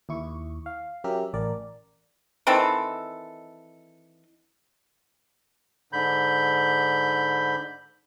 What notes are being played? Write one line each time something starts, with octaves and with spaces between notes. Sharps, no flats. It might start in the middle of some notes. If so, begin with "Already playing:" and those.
D#2 E4 C#6
F5
F#3 C#4 G4 A#4 E5
A1 A#4 D5
D#3 E3 C4 A4
G#2 D3 B5 G6